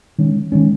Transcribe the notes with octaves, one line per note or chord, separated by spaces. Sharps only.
D#3 G#3 C#4
D#3 G#3 C#4